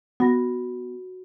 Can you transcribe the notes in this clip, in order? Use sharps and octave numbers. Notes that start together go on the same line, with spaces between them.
B3 F#4 B5 A#6